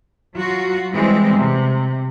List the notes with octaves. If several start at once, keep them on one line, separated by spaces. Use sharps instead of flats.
F#3 F4 F#4
E3 G3 G#3 C4
C3